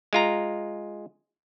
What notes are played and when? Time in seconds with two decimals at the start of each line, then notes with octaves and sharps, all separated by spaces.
0.13 G#3 F4 A#5